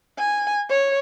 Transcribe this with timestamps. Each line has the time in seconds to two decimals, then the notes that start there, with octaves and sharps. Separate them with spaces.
0.19 G#5
0.70 C#5